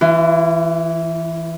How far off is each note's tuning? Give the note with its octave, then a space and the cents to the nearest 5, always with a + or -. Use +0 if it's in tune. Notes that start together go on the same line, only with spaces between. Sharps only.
E3 +0 F4 -45